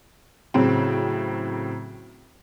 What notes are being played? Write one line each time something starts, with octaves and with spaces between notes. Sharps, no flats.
A2 C#3 F#3 C4